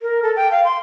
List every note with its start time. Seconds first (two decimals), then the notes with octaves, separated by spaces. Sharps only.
0.02 A#4
0.23 A4
0.36 G5
0.51 F5
0.64 C6